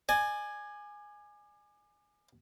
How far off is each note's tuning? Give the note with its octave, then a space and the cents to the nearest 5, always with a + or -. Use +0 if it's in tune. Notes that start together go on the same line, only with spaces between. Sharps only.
D5 +35 G#5 +0